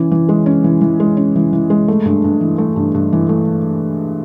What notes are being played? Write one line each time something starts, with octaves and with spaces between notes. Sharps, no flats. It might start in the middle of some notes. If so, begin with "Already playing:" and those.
Already playing: E3 C#4
E3
G#3
C#4
E3
E3
G#3
C#4
E3
E3
G#3
A3
G2
G2
E3
A3
G2
G2
E3
A3